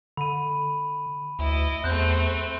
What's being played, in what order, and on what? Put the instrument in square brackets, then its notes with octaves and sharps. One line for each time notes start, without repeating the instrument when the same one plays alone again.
[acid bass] D3 [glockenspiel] B5 D#7
[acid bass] D2 [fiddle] E4 D#5
[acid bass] E2 [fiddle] A3 C4 [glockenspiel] F#6 G6